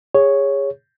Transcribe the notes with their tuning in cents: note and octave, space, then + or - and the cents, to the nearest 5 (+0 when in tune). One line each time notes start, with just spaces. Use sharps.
G#4 -30 C#5 +0